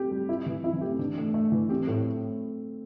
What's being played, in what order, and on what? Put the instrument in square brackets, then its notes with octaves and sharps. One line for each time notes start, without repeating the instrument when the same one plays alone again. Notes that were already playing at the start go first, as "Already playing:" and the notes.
Already playing: [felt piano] A3 C4 [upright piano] G4
[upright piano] G3
E4
E3
[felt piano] C4 [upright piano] E4
[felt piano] E3
[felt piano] A3 [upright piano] G4
[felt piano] C4
[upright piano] E3 [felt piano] D4
[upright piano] A3
A3
E3
[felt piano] C4 [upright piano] G4
[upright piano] A2 [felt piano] A3